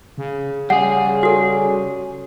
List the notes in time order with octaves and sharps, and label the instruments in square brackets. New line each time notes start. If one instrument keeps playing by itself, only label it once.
[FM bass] C#3
[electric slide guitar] G3 G#4 [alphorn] C#4 [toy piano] F#5
[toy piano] F#4 A4